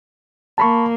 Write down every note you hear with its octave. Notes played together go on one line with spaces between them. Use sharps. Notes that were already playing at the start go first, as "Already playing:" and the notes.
A#3 A5 B5 C#6